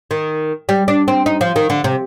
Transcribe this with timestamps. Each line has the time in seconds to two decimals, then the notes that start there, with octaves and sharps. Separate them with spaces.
0.11 D#3
0.69 G3
0.88 D4
1.08 C4
1.26 D#4
1.41 F3
1.56 D#3
1.70 D3
1.84 C3